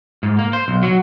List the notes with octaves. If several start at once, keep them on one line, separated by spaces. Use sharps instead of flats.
G#2
A#3
C5
B1
F#3